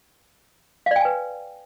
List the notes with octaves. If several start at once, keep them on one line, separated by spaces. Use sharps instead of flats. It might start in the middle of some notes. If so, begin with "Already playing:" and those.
B4 D5 F5 G5 G#5